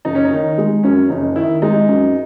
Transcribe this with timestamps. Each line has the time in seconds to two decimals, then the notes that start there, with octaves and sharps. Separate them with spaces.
0.05 F#1 D#4
0.15 C#4
0.25 D#4
0.31 D#3
0.58 G#3
0.83 F#2 C#4
1.10 F#1 D#4
1.36 D#3 E4
1.62 G#3 D#4
1.89 F#2